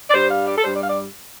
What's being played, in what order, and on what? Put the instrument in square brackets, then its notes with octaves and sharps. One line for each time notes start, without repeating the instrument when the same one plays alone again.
[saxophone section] D5
G2 G3 C5
F5
D5
A4
G2 G3 C5
D5
F5
D5